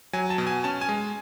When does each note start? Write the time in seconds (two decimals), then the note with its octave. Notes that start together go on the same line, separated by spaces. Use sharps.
0.13 F#3 G#5
0.30 A5
0.38 B2
0.47 G#5
0.64 C#4 A5
0.81 G#5
0.89 G#3